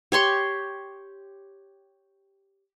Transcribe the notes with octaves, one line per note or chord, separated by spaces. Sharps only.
G4 C#5 C6 C#6